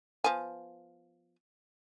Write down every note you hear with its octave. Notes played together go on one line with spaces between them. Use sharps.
F3 B3 G#5